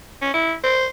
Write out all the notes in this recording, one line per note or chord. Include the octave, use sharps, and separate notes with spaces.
C#4
E4
C5